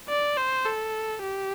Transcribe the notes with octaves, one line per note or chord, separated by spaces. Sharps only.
D5
C5
A4
G4